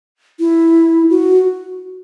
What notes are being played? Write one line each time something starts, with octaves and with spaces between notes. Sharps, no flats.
E4
F#4